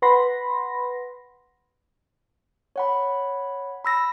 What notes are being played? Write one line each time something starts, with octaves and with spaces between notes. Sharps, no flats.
B4 F#5 B5 C6 A#6
C#5 F#5 B5
B5 E6 A#6